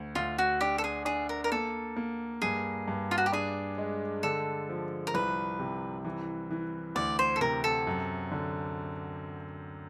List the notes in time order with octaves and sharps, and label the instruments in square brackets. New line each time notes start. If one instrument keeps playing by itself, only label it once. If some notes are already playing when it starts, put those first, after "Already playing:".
Already playing: [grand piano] D2
[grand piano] D2 [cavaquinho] F4
[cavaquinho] F#4
[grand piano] D4 [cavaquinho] G4
[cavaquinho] A4
G#4
[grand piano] D4 [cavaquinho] G#4
[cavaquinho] A#4
A#4
[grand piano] A#3 [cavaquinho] A4
[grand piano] A#3
[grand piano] G2 [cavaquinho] G#4
[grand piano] G2
[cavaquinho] F4
F#4
G4
[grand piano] D4 [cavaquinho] G#4
[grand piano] G#3
[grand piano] D3 [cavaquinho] A4
[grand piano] F3
[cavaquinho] A#4
[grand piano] C2 [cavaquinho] B4
[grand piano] C3
E3
E3
[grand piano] D2 [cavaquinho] D5
[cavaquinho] C5
A4
[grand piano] C3 [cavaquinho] A#4
[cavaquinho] A4
[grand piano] F#2
D3